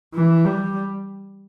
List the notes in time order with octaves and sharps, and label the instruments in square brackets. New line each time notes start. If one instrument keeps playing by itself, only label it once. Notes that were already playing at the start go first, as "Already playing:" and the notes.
[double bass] E3
G3